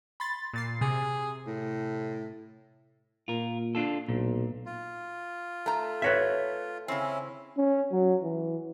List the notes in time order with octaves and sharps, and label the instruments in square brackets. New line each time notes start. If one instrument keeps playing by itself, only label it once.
[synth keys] B5 C6 A6
A#2 A6 C7
[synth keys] C3 [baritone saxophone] G#4
[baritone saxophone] A2
[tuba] A#2 [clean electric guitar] F4 A#4
[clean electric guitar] D4 F4 A4
[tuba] B1 [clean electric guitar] A#2
[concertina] F4
[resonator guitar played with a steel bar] A3 A#5
[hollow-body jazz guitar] B4 C#5 E5
[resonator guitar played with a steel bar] C#3 C4 [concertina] C#4 E4
[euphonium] C#4
F#3
E3